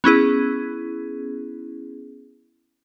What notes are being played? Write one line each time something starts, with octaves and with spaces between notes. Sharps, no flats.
B3 C#4 E4 G#4